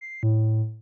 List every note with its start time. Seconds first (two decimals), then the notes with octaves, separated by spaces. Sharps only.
0.01 C7
0.23 A2